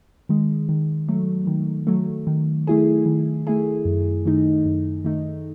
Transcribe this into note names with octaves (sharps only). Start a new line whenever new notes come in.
D#3 G#3
D#3
F#3 A3
D#3
F#3 A3
D#3
A3 E4 G#4
D#3
A3 E4 G#4
F#2
D#3 A3 D#4
F#2
D#3 A3 D#4